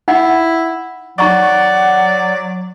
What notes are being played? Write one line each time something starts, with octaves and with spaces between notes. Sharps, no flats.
D#4 E4 F#5 B5
F#3 D#4 D5 F#5 A#5 C#6